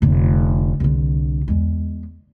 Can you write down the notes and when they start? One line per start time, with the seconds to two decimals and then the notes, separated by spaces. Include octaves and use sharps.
0.02 F1 D3
0.80 C2 D3
1.48 E2 G#3